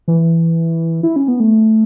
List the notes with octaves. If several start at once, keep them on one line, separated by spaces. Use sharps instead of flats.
E3
E4
C#4
B3
A3